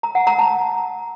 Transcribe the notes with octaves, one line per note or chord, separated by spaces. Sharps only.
A#5
F#5
A#5
A5